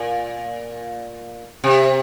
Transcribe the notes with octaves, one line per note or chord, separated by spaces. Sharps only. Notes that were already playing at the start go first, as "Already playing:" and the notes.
Already playing: A#2
C3